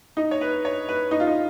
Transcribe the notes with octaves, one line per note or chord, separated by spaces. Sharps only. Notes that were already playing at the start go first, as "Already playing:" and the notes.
D#4
C#5
B4
C#5
B4
D#4
F4
D#4